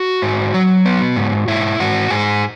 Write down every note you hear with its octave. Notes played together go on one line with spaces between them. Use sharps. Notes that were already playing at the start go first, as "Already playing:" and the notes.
Already playing: F#4
G#2
F#3
B3
G#2
G#2 E4
G#2 F#4
G#2 G#4